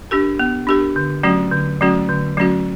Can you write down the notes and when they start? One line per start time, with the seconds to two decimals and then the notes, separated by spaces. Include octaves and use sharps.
0.11 D4 G4 A#4
0.39 B3
0.67 D4 G4 A#4
0.96 D3
1.23 F#3 A3 C#4 F#4
1.52 D3
1.81 F#3 A3 C#4 F#4
2.09 D3
2.37 F#3 A3 C#4 F#4